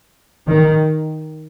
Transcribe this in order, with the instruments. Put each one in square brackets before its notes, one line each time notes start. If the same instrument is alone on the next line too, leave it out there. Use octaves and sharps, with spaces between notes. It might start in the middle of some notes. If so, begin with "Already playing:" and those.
[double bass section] D#3